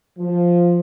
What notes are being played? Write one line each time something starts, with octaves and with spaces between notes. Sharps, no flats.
F3